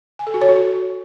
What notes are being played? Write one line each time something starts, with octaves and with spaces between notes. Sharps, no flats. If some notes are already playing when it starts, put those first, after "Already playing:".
G#5
A4
F#4
C#5
F#4